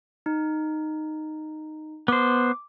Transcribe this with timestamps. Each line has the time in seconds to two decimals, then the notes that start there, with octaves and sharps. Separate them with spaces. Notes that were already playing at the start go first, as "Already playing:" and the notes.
0.26 D#4
2.08 B3 C5 D6